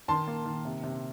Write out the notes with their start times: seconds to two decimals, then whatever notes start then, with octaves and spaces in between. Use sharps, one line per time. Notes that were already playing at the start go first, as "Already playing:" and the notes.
0.08 D#3 A5 C6
0.28 A#3
0.46 D#3
0.65 C3
0.84 C3